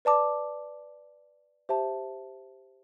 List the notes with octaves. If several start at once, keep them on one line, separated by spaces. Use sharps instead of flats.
B4 D5 A5 D6
G4 C5 E5 A5